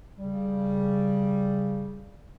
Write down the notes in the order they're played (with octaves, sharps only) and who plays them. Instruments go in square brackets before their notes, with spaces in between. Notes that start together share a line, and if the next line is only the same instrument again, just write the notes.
[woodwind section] C#3 G3